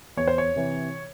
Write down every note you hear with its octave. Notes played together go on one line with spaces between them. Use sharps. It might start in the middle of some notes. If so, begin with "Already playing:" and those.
E2 C#5
C5
C#5
C3 E3